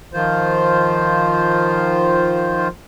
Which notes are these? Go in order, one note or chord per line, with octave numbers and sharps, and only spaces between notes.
D#3 F3 F4 C5